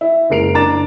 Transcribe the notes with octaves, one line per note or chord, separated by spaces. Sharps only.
E4
F#1 G#3 A#4 C7 D7 F7
F#1 D4 A#5 D6 A6 E7